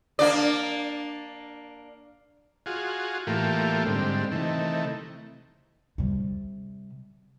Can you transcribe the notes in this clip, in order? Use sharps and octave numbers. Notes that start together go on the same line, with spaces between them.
A#3 D4 D5
F4 F#4 G#4
A2 E3 A3 A#3 F4 G4
G#2 D3 G3 C4
C3 D#3 E3 A3
C3 G3